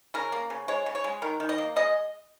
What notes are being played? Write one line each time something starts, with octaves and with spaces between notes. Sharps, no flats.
C#3 A#4
A#3
C#3
G#3 C#5
C#3
C#5
G#3
D#3 A#4
D#3
D#5
A#3
G#3 D#5